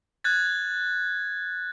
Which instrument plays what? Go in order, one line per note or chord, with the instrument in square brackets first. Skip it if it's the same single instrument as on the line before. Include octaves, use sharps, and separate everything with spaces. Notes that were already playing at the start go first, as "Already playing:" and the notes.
[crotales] F#6 G#6 A6